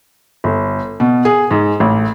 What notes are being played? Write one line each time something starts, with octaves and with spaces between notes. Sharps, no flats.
G1
B2
G#4
G#2
A1